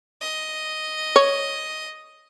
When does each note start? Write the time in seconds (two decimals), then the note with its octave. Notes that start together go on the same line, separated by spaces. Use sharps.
0.21 D#5
1.16 C#5